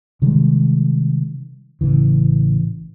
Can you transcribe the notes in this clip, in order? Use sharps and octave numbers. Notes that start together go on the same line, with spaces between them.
C3 D#3 G3 G#3
A1 C#3 E3